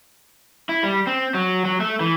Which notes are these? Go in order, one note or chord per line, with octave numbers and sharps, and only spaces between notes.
E4
G3
C4
F#3
F#3
A3
E3